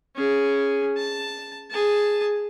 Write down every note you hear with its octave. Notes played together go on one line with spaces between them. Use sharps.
C#4 G#4
A5
G#4 A5